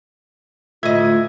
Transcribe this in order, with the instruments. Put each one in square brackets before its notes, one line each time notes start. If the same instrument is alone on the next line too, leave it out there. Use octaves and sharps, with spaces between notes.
[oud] D2 A2 D#5 [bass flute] F4 [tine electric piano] E5 G#6